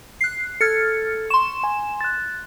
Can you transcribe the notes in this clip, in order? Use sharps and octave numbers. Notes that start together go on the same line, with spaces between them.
F#6 C7
A4 F6 G#6 A6 C#7
C6 C#6 E7
G#5
F#6 A6